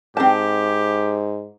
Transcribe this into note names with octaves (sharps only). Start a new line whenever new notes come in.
G#2 C4 G4 A5